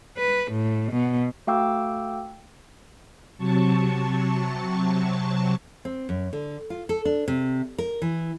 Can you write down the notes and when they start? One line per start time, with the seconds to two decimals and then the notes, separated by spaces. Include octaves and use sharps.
0.17 B4
0.51 A2
0.92 B2
1.47 A3 F#4 F5 G5 D6 E6
3.38 C3 F#3 A5 C#6
5.85 C4
6.09 F#2
6.33 D3
6.70 F4
6.89 A4
7.05 D4
7.28 C3
7.78 A#4
8.02 E3